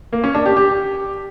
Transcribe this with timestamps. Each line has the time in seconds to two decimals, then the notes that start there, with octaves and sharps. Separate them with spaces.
0.13 A#3
0.24 C#4
0.35 D4
0.46 G4
0.57 G4